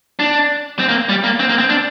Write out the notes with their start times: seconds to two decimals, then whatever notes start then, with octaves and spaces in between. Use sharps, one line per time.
0.19 D4
0.79 C4
0.89 A#3
1.09 G3
1.24 A#3
1.40 C4
1.49 A#3
1.59 C4
1.69 D4